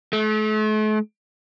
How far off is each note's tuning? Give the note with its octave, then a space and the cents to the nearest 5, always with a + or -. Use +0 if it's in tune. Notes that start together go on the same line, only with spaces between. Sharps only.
A3 -40